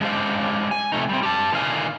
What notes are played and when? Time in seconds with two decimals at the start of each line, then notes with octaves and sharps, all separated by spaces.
0.01 G#3 C#4 D4 G4 C5 F5
0.71 G#5
0.92 C3 F3 A3 D#4
1.09 G3 C4
1.23 G4 A5
1.52 A#2 D3 D#3 B3 F5 G#5